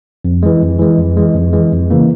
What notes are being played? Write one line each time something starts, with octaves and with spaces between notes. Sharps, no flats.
F2
E3 G#3
F2
E3 G#3
F2
E3 G#3
F2
E3 G#3
F2
C#3 E3 A#3